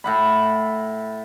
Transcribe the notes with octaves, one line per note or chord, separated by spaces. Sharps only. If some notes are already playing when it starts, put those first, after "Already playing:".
A2 F#5 B5